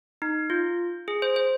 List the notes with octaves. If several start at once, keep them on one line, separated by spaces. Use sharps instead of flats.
D#4
F4
G#4
C5
C5